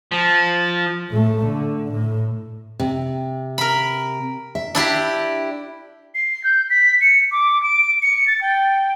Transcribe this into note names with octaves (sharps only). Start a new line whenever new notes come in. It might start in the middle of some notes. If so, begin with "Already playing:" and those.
F3
A2 A3
D3
A2
C3
A#4 B5
E5
D4 E4 G4
C7
G6
B6
C#7
D6
D7
C#7
A6
G5